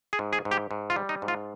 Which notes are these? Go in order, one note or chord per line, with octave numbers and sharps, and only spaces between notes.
G#4
G#2
G#4
G#2
G4
G#2
F4
G3
D#4
G#2
F4